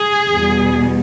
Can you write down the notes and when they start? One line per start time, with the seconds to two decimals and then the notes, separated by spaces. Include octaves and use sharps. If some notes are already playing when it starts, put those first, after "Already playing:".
Already playing: G#4
0.31 E2 B2 G3 B3